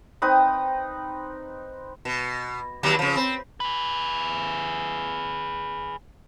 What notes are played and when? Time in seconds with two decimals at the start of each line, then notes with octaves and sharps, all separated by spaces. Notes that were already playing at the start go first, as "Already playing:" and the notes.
0.22 C4 D#4 B4 D#6
2.05 B2
2.83 D#2 F#3 G3
2.99 C#3 F3
3.16 C4
3.60 G#4 B4